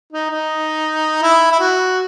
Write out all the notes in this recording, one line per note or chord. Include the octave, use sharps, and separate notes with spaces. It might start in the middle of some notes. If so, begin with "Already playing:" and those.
D#4
D#4
E4
E4
F#4